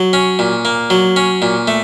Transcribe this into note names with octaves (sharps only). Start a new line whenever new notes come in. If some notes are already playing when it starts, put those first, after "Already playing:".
Already playing: F#3
C#4
A#2
A#3
F#3
C#4
A#2
A3